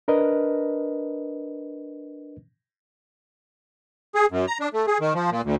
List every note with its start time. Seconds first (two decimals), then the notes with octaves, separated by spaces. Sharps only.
0.08 D4 A#4 B4 D#5
4.15 G#4
4.31 F#2
4.47 A#5
4.60 D4
4.73 A3
4.87 G#4
5.01 D#3
5.14 F3
5.31 A#2
5.44 D2